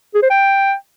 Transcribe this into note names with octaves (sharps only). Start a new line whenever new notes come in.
G#4
C5
G5